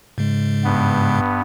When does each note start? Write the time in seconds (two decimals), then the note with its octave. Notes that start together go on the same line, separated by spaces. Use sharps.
0.18 G#2 C#3 G#3
0.64 G2 B3